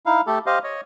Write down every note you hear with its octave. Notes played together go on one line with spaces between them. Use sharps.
D#4 E4 F5
A3 G4 A4
G4 C5 D#5 F5
C#5 D#5